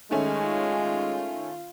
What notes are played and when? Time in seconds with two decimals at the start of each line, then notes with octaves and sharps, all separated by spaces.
0.11 D#3 G#3 A3 C#4
0.43 F4